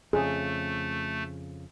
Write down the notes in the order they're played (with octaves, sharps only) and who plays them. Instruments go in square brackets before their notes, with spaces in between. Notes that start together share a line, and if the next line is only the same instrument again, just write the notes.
[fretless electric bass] F2 C#3 [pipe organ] A3 [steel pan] G#4